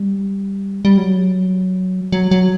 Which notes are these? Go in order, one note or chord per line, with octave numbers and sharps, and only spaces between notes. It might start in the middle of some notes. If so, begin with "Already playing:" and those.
Already playing: G3
G3
F#3
F#3
F#3